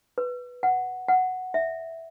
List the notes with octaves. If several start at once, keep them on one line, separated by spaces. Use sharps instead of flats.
B4
F#5
F#5
E5